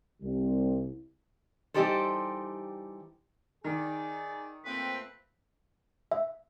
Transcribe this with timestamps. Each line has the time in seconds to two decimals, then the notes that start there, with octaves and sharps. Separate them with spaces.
0.22 C2
1.74 E3 G3 D#4 G4 A4 C5
3.64 D#3 D#4 G#4 D5
4.65 A#2 A3 C4 B4
6.12 E5